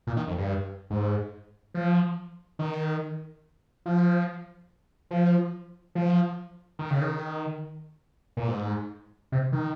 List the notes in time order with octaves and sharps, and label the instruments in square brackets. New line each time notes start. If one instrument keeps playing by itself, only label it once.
[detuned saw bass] A#2
D#3
F2
G2
G#2
F3
D#3
F3
F3
F3
D#3
C#3
D#3
A#2
G#2
C3
D#3